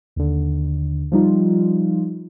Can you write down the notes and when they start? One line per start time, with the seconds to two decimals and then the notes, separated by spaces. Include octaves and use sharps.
0.16 D#2 D3
1.12 F3 G3 D#4 F4